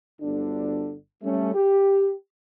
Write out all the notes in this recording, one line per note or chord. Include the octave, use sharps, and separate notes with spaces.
G1 D2 D3 D4
G3 A3 C#4
G4